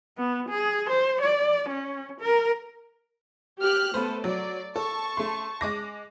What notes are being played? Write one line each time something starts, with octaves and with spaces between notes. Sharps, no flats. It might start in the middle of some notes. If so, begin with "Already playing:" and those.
B3
G#4
C5
D5
C#4
A#4
G4 F6 F#6
A3 B3 A4 B4 C5
F#3 D5
A4 A5 C#6
A3 C6
G#3 D6 A#6